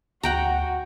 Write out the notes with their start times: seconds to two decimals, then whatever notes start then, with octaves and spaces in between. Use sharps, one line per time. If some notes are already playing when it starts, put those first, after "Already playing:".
0.23 D2 F#4 F#5 G5 A#5